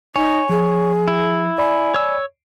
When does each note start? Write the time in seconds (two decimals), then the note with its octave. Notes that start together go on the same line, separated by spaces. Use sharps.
0.16 D#4 C#5 G#5
0.49 F3 G#4
1.08 E4
1.58 D5 G#5 B5
1.94 C#5 E6